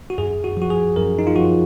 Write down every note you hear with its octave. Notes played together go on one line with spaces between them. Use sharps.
F#4
F#2 G#4
F#4
F3 F#4
G#4
F#2 A#4
D#4
F4
F3 F#4